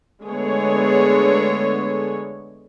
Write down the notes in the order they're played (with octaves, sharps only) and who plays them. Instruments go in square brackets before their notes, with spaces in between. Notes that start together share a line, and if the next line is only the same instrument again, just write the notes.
[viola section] D3 G#3 A3 B3 G#4 C#5